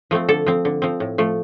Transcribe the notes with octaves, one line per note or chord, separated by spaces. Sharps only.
F3 A3 C4
D3 A4
F3 C4
D3
F3 C4
A2
F3 A3